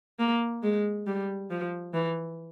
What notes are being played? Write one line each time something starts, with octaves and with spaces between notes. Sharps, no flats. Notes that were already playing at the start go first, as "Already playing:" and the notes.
A#3
G#3
G3
F3
E3